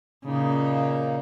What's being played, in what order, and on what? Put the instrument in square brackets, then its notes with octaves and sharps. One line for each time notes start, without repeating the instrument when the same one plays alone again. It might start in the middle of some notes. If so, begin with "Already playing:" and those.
[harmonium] A#2 A#3 D#4 [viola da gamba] C#3